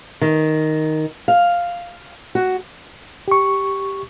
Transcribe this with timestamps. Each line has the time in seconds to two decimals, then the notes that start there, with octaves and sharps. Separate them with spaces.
0.21 D#3
1.28 F5
2.35 F#4
3.28 G4 C#6